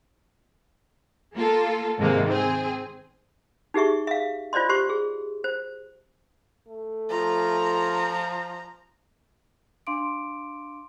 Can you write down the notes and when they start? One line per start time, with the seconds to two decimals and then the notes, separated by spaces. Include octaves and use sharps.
1.35 A#3 F4 A4
1.98 G#2 C3 D#3 G#3 A#3
2.29 C4 G#4
3.74 D#4 G4 G#4 E5 C#6
4.07 E5 F5
4.53 F4 C5 D5 D#5 C6
4.69 G4 C5 C6 C#6
4.89 G#4
5.44 C5
6.68 A3
7.11 F3 F4 A#5
9.87 D4 F5 C6 D6 D7